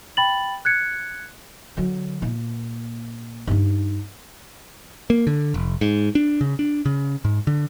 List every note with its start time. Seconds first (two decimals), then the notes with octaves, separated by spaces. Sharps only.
0.17 G5 B5 A6 F#7
0.65 F#6 G#6 C#7
1.77 D3 F#3
2.21 A#2 A#3
3.47 G2 D#4
5.10 A#3
5.27 D3
5.54 F1
5.81 G#2
6.15 D4
6.41 C#3
6.59 D4
6.86 C#3
7.25 G#2
7.47 D3